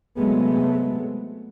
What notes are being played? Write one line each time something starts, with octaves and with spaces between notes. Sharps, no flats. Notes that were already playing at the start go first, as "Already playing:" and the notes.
C3 F#3 G#3 A3 B3